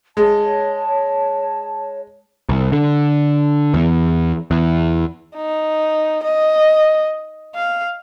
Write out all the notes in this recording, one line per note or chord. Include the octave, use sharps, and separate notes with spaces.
G#3 C#5 A5
C2
D3
E2
E2
D#4
D#5
F5